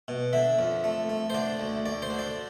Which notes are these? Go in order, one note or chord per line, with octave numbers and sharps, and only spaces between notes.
B2
D3 E5
F2
A3
A3
C5
D3 D5
D2
D2 D5
C5
D3
D5